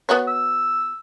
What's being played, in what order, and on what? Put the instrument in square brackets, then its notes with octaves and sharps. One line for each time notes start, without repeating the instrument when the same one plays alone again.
[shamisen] B3 F#4 C#5
[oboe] E6